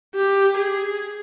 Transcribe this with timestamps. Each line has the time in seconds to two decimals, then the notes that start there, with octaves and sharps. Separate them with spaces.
0.15 G4
0.57 G#4